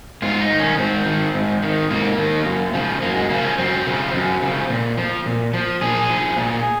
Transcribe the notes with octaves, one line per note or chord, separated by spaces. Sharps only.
G#2 F4
D#4
D#3
C#4
G#2 C4
D#3
G#2
D#3
G#2 A#3
D#3
F#2
C#3 F3
F#2 A#3
G#3
C#3 F3 A#3
C#4
F#2 C4
C#3 F3
F#2
C#3 F3
A#2
F3
A#2
F3
A#2 G#4
F3
A#2